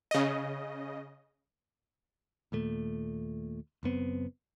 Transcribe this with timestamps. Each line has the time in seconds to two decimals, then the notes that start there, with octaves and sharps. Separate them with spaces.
0.11 C#3 D#5
2.52 D#2 A#2 A3
3.83 F#1 F#2 B3 C4